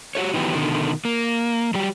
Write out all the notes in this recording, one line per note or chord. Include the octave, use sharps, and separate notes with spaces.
F#4 G4 A4 C#5
D#3 E3 F#3 B3 G4
B2 D3 D#3
A#3
F#3 G3 G4